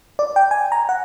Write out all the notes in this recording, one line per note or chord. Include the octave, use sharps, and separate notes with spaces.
D5
G5
G#5
A#5
F#5